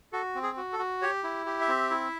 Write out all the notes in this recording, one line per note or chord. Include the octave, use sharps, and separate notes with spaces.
F#4 A4
C4
G#4
F#4
A4
F#4
G4 C#5
E4
G4
E5
C4
E4